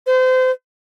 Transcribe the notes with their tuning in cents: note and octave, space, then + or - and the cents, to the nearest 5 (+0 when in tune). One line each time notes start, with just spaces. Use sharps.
C5 -30